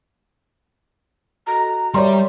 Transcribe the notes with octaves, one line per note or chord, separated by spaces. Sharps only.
F#4 A4 D#5 A#5
G3 A#4 C#5 D5 E5 C6